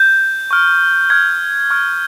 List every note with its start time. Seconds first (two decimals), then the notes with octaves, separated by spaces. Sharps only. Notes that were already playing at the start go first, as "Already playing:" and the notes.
Already playing: G6
0.51 C#6 F6
1.10 C#6 F6 G#6
1.70 C#6 F6